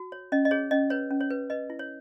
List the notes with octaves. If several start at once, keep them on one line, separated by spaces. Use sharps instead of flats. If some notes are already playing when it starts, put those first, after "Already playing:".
Already playing: F#4
C#5
C#4 D#5
D#5
G#4 C#5
C#4 D#5
B4 C#5
C#4
C#5
B4
B4 D#5
E4
C#5